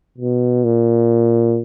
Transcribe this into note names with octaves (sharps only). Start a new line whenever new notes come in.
B2
A#2